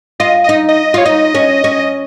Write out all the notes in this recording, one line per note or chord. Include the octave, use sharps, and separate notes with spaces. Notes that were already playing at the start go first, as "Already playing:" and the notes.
F4 D#5
D#4 D#5
D#5
F4 C#5
D#4 D#5
C#4
C#4